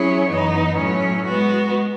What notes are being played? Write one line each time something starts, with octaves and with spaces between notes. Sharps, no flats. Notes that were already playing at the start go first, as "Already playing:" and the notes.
Already playing: F#3 C#4 E4 G#4 C#5
F#2 E3 B3 D#4
A2 F#3 C#4
G#3 B3 F#4